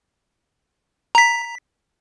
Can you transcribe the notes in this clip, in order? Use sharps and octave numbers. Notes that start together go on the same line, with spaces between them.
A#5 B6